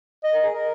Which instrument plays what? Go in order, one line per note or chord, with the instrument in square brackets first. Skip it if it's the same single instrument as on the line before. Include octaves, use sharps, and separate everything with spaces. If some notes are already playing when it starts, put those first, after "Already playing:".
[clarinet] D#5
[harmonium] A#4
G#4
A#4